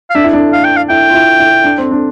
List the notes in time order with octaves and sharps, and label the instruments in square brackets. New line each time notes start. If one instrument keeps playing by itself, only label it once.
[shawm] F5
[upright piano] D4 [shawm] E5
[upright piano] E4
D4
[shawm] F5
G5
F5
[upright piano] E4 [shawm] G5
[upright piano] F4
E4
E4
D4
C4
D4